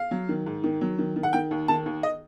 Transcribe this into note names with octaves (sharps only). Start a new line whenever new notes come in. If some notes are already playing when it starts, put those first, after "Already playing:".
Already playing: F5
F#3
D#3
G#2
D#3
F#3
D#3
D#3
F#5
D#3 G5
D#2
D#3 A5
D#2
D#5